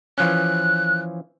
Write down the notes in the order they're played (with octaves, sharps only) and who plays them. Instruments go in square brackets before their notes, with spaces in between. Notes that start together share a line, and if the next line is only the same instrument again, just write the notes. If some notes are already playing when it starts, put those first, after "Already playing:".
[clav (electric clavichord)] E3 F3 C#4 [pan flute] F#6